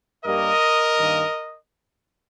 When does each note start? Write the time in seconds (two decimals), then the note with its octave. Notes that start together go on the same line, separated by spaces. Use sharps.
0.24 G2 G3 A#3 A#4 D#5
0.98 G2 D#3 A#3